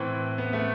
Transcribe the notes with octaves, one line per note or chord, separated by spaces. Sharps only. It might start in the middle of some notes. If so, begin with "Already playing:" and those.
Already playing: A2 E3 C4
B3
A3